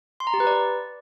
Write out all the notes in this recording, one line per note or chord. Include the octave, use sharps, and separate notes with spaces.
C6
A#5
G4
B4
D5